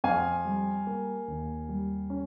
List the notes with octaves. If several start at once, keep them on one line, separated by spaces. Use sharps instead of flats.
F2 F5 G#5
G3
A#3
D#2
G3
C#4